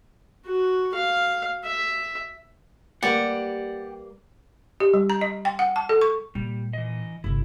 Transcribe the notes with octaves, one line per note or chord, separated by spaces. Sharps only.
F#4
F5
E5
G3 A#3 G4 B4 D5 F#5
G4
G3
A#5
D#5
G5
F#5
A5
A4
C#6
A#2 G3
E3 D#5
G1 C2 E4